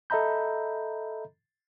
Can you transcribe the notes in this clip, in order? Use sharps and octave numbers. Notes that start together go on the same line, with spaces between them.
A4 D#5 E5 A#5 B5 G6